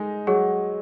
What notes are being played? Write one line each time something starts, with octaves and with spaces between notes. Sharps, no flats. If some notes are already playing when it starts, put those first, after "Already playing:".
Already playing: G#3 D#4
F#3 G#4 C#5 F#5 C#6